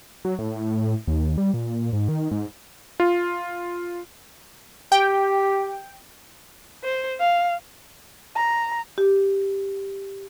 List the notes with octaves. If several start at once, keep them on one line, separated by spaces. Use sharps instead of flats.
F#3
A2
D#2
G3
A#2
G#2
D#3
G#2
F4
G4 G5
C5
F5
A#5
G4